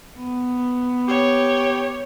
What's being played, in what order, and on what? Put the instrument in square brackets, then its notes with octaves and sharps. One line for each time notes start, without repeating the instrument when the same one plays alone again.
[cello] B3
[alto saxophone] G4 [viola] C#5